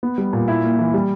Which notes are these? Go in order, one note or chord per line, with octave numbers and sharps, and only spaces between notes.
B3
G3
A#2
E4
A#3
E3
G3